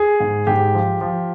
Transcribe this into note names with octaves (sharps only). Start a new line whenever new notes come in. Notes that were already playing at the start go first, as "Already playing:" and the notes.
Already playing: G#4
G#2
G#2 G4
F3
F3